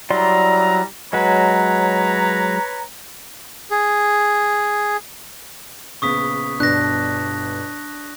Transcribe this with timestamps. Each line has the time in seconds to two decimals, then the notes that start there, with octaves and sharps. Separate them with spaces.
0.10 F#3 G3 E4 D5 A#5 C6
1.13 F#3 G#3 B4 C#5 A#5
3.71 G#4
6.02 A#1 C#3 B3 C#6 D#6 B6
6.60 G1 B2 D4 F#6 A#6